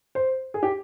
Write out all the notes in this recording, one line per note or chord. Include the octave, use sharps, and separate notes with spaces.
C5
G#4
G4